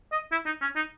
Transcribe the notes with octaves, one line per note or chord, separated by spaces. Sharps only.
D#5
E4
D#4
C#4
D#4